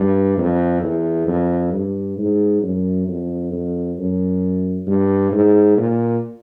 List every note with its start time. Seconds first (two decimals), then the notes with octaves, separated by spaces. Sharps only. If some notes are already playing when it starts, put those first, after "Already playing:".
Already playing: G2
0.38 F2
0.83 E2
1.27 F2
1.72 G2
2.18 G#2
2.63 F#2
3.08 F2
3.53 F2
3.98 F#2
4.87 G2
5.32 G#2
5.77 A#2